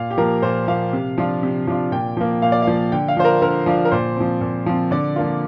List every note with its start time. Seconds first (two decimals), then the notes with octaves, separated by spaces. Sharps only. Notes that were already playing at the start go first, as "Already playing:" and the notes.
Already playing: A#2 F5
0.11 G4
0.18 F3 A#3 A#4
0.42 A#2 C5
0.68 F3 A#3 F5
0.93 C3
1.18 F3 D4 F4
1.43 C3
1.67 F3 D4 F4
1.92 A#2 G5
2.17 F3 A#3
2.42 A#2 F5
2.52 D5
2.62 F5
2.67 F3 A#3
2.92 D3 G5
3.08 F5
3.17 F3 D4 F4 C5
3.25 A#4
3.42 D3 A#4
3.66 F3 D4 F4
3.85 A#4
3.91 A#2 C5
4.16 F3 C4
4.41 A#2
4.66 F3 C4
4.91 D3 D5
5.16 F3 A#3 F4